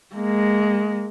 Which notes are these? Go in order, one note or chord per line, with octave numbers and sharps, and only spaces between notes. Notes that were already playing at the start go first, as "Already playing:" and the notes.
G#3 A#3